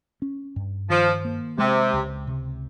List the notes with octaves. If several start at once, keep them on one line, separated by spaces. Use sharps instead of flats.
C#4
G2
D#3 F3
A#3
C3 G#3
C#2
C3